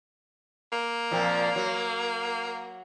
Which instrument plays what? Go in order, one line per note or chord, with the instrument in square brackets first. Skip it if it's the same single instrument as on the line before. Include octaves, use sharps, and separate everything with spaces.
[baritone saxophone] A#3
[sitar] A#2 F3 C4
F#3